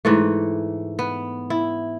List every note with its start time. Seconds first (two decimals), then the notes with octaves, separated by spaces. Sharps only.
0.05 G#2 E3 A3
0.99 B3
1.50 E4